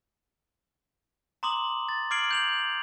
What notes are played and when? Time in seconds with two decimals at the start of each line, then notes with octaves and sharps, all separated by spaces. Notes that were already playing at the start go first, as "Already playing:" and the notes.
1.43 A#5 C6 D6 D#6 F#7
1.89 A6
2.11 D6 F6 G#6 C7 D7 F#7
2.31 G6 F7 F#7